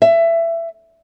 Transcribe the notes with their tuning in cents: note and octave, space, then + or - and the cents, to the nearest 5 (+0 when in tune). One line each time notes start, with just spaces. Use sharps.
E5 +20